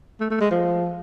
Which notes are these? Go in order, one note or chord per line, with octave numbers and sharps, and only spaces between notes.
A3
A3
G#3
F3